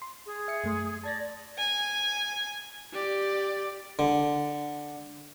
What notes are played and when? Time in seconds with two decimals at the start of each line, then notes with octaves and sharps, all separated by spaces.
0.02 C6
0.26 G#4
0.48 E5 C#7
0.64 F#2 A3 C6
1.04 D5 A5 G#6 A#6
1.58 G#5
2.93 G4 D5
3.99 D3